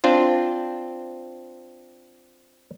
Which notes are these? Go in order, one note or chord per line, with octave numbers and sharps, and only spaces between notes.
C4 D4 F4 C5